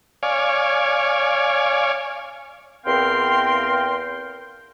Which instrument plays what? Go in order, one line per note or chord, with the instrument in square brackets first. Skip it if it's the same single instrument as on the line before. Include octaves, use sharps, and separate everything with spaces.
[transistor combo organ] C#5 D5 F5 G#5
[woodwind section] E2 C4 A#4 F5 G5 C6